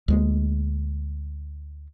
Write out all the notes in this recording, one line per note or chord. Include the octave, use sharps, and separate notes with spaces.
D2 G#3 A#3